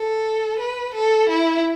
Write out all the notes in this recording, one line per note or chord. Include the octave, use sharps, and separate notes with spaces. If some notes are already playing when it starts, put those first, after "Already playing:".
Already playing: A4
B4
A4
E4